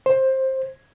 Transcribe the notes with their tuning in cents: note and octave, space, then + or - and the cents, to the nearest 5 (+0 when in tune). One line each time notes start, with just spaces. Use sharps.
C5 +15